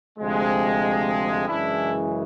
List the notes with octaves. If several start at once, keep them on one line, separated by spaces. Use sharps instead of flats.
D2 C3 F3 G#3
F#2 C#3 E3 G#3 D4 E4